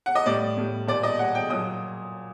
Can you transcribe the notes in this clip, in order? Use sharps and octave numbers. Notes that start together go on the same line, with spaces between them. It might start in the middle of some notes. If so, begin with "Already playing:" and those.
F#5
D#5
A2 G3 D5
A2 G3
A#2 G3 D5
D#5
A#2 G3 F#5
G5
A#2 F#3 D#6